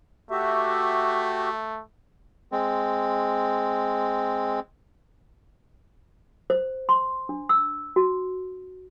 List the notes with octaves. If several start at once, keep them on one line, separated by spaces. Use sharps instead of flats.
A3 F#4 G4 E5
G#3 C4
C5
C6
D4
E6
F#4